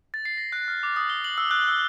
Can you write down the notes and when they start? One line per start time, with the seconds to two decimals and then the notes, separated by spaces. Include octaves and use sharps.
0.14 A6
0.25 C7
0.37 A#6
0.52 F#6
0.68 F6
0.83 D6
0.96 D#6
1.10 G7
1.24 F#7
1.38 E6
1.51 F#6
1.68 E6